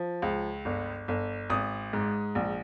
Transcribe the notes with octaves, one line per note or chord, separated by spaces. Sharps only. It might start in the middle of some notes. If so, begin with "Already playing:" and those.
Already playing: F3
C#2
G1
G1
G#1 D#6
G#2
A#1